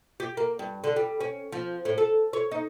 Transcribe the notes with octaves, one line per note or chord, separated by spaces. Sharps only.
G4
A#3
G2
D3
G3
C#4
F3
A2
A4
C#5
D#4